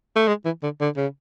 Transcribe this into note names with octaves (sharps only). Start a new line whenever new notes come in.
A3
G#3
E3
D3
D3
C#3